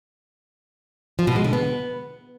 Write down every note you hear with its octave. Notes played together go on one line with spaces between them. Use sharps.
F3
B2
G#3
D3
B3